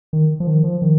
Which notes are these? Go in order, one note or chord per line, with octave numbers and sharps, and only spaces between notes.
D#3
F3
D#3
F3
D#3